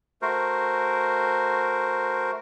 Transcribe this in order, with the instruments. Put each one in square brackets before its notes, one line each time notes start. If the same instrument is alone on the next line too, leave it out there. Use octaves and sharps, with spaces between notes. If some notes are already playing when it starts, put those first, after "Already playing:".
[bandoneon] A3 F#4 A#4 C5